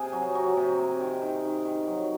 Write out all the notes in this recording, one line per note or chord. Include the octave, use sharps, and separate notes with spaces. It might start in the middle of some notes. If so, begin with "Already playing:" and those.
Already playing: C3 G#4
F#3
F#3
C3
C3
D#3
D#3
D#3
D#3
F#3